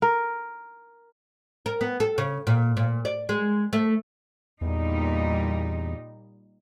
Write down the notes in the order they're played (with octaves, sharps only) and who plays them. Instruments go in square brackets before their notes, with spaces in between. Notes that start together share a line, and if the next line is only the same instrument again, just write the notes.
[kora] A#4
[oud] A#4
B3
A4
C#3
A#2
A#2
D5
G#3
A3
[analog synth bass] E2 [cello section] A#2 G3 D#4